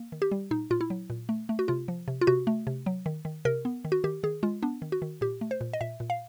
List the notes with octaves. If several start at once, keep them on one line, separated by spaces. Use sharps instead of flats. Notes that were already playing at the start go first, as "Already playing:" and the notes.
Already playing: A#3
D#3
G4
G3
A#2 D#4
A#2 F4
E4
F#3
A#2
A3
A3
F#4
C3 F4
F3
C3
F4
C3 F#4
A3
C3
F#3
D#3
D#3
C3 A#4
B3
D#3
F#4
D#3 G4
D#3 G#4
G#3 F4
B3 D4
D#3
F#4
D#3
A#2 G4
A3
C5
A#2
D#5
A#2 E5
A#2
F5